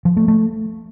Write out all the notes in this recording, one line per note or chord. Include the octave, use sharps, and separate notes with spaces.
F3
A3
A3